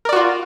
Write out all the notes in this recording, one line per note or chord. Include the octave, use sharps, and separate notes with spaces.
F4 F#4 A#4 D5